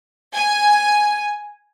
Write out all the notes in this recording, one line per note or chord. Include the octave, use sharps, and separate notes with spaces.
G#5